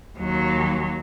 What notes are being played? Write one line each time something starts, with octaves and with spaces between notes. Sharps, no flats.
D#2 F#3